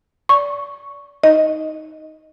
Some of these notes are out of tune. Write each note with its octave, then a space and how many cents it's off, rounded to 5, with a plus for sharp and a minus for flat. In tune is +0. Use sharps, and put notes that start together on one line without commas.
D5 -30 C#6 +0
D#4 +10 D#5 +0